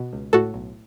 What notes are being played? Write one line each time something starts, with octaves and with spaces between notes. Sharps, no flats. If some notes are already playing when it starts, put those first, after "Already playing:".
Already playing: B2
C#2
A2 F#4 A4
B1